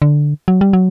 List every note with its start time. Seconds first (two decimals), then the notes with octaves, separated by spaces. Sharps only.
0.02 D3
0.48 F#3
0.61 G3
0.73 F#3